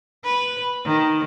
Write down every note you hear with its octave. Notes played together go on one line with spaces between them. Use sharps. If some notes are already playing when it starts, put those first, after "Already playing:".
B4
D#3